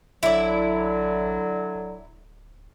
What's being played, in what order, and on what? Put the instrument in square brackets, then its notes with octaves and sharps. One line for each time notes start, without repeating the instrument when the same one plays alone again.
[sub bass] A1 [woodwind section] D3 F#3 [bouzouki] E4 D5
[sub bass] D1